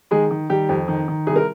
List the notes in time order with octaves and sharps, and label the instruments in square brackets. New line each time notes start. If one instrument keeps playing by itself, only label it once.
[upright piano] D#3 G#3 G#4
D#3
D#3 G3 G4
F2
D#3
D#3
C2 G#4
A#4